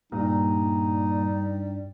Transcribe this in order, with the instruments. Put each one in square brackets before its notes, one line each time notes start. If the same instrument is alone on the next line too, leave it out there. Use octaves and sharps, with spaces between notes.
[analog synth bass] G2 [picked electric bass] A#2 [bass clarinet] G3 [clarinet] D#4